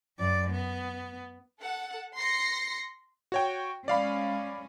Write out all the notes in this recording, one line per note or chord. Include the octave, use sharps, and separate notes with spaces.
F#2 D5
B3
A4 F#5
C6 A#6 C7 C#7
F#4 C#5 G5
G#3 C#4 D5 F5 B5